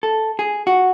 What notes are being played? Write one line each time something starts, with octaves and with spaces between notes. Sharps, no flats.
A4
G#4
F#4